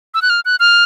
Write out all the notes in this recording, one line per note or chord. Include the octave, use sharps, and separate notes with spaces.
E6
F#6
F6
F#6
F6